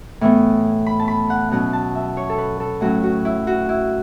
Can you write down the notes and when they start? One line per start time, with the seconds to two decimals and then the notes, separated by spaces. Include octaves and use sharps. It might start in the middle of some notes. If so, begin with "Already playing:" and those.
0.21 A2 E3 B3
0.86 B5
1.00 A5
1.08 B5
1.30 F#5
1.51 B2 F#3 C#4 F#5
1.73 A5
1.95 E5
2.17 C#5
2.30 A4
2.38 B4
2.60 A4
2.81 A2 F#3 C#4 F#4
3.03 F#4
3.25 E4
3.47 F#4
3.69 E4